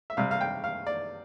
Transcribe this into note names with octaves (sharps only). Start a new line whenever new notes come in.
E5
C3 G3 C4 F5
F5
G5
F5
D5